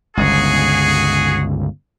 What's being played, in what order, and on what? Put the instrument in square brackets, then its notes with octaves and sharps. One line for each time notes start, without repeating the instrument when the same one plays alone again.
[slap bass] G1 C#2 [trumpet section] F#4 G#4